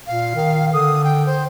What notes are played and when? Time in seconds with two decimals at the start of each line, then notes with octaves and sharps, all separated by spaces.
0.07 A#2 F5
0.35 D#3
0.73 D3 D#6
1.04 G5
1.26 C5